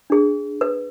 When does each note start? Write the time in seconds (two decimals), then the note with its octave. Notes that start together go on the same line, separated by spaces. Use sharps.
0.10 D4 G#4
0.61 B4